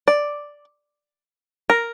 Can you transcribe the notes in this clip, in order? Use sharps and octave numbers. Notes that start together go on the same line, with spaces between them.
D5
A#4